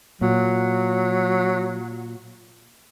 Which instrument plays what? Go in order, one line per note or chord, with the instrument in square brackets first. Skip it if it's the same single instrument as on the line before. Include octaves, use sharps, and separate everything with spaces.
[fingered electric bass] A#2 [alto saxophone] F#3